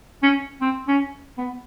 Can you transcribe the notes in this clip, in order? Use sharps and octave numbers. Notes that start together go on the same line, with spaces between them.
C#4
C4
C#4
B3